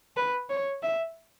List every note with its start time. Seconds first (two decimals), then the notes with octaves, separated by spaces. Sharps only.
0.17 B4
0.50 C#5
0.83 E5